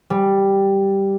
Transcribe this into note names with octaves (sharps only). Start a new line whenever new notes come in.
G3